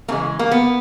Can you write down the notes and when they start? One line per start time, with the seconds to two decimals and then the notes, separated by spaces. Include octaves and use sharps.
0.08 C#3 E3 G#3 A#3
0.39 A#3
0.51 B3